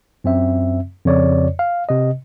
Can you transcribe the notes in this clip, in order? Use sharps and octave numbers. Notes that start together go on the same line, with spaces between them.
F#2 C4 E5
F2 C#3 C#5 D5
F5
C3 D#5